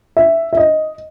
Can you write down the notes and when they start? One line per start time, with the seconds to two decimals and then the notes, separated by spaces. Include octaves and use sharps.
0.17 E5
0.53 E5
0.57 D#5